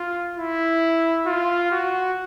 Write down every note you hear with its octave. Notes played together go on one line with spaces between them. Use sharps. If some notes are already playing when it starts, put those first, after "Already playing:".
Already playing: F4
E4
F4
F#4